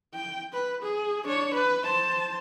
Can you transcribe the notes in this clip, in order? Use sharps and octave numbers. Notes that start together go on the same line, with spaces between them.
G5
B4
G#4
D4 C#5
B4
C5 A5